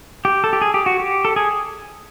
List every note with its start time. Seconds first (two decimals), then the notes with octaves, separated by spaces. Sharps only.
0.25 G4
0.44 A4
0.53 G4
0.62 G#4
0.74 G4
0.86 F#4
1.00 G4
1.25 A4
1.36 G#4